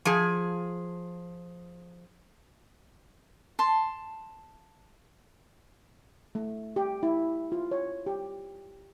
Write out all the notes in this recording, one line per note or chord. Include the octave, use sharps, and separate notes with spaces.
F3 G#4
A5 C6
A3
G4
E4
F4
C#5
G4